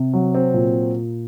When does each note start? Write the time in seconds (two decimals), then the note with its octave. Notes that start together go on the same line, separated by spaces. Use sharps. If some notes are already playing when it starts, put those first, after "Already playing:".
Already playing: C3
0.13 F#3
0.35 C4
0.54 A#2